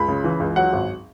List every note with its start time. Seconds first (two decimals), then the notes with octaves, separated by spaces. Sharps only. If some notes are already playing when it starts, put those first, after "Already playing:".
Already playing: C#2 B5
0.08 C#3
0.24 E3
0.40 C#2
0.56 F#3 F#5
0.73 G#1